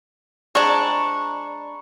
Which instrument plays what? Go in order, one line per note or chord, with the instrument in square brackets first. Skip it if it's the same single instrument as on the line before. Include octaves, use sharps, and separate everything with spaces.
[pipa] G#3 C4 D4 [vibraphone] D5 A#5 B5 [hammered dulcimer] C#6